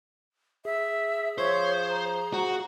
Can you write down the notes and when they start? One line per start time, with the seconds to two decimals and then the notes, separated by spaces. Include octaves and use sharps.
0.65 G#4 E5
1.38 F3 C5 C#5
1.90 A#5
2.33 F#4